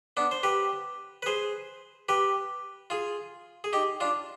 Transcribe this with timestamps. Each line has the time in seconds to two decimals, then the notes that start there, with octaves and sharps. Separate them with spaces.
0.17 B3 D4
0.31 C5
0.43 G4 B4
1.22 B4
1.26 G#4 C5
2.09 G4 B4
2.90 F4 G#4
3.64 G#4
3.73 D#4 G4
4.00 D4 F4